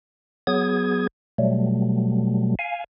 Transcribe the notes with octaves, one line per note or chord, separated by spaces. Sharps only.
F#3 B3 G#4 D#6 G#6
B2 F#3 G3 A3
F5 G#5